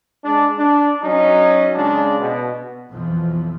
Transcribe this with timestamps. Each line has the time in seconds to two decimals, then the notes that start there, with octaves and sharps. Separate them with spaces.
0.25 G#3 D4
0.58 D4
1.03 F#3 C#4 D#4
1.76 C#3 G#3 D4
2.20 B2
2.91 B1 F2 B2 E3 F3